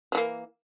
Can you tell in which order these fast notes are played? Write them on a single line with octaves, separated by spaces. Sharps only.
F#3 E3 A#3